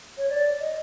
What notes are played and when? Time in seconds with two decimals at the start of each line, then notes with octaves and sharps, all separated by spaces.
0.18 C#5
0.29 D5
0.60 D#5